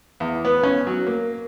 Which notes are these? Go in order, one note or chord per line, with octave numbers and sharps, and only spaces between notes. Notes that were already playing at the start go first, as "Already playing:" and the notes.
E2
B3
C#4
F#3
A#3